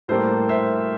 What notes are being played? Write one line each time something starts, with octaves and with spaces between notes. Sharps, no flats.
A2 G3 A#3 A4 C5
C5 E5